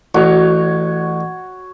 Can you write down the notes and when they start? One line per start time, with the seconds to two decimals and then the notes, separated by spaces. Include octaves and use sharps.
0.15 A1 F#4 C#5